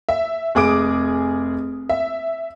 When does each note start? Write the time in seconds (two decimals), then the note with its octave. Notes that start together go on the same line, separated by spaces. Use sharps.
0.09 E5
0.55 F1 G#4 D6 D#6 D7
1.89 E5